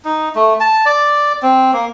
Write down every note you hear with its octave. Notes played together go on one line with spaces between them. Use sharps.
D#4
A3
A5
D5
C4
A#3